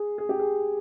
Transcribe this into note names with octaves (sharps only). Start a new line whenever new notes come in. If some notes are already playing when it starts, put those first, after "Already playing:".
Already playing: G#4
G#4
G4
G#4